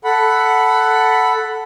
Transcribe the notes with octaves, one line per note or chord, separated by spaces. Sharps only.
A4 F#5 B5